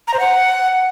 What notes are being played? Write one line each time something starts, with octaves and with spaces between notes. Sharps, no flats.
A#5
C5
F#5